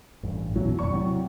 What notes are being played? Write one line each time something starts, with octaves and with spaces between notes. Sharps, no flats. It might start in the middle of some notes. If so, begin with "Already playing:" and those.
A1 G2
A#1 E2 B2 F#3
F1 D#2 A#2 D5 C#6
A2 C3 F#3